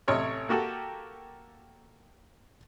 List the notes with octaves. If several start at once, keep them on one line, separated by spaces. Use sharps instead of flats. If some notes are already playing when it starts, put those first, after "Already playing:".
A1 C3 C#5 D#5 F6
A#3 F#4 G4 A4